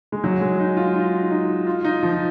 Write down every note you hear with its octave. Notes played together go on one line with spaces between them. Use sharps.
G#3
F#3
G#3
D#4
F4
D#4
D#4
F4
D#4
F3